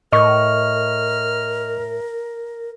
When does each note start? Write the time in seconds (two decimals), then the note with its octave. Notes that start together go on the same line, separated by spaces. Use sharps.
0.13 A2 A#4 D#5 C#6 F6